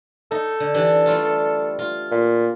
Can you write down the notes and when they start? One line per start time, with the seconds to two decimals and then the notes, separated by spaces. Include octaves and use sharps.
0.31 D#4 A4
0.60 D3
0.74 E3 D4 G4
1.06 G3 A3 F4
1.79 F4
2.11 A#2